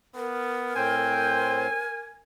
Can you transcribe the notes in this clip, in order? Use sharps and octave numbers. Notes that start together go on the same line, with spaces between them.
B3 A#4
A2 C4 C5 G5 G#5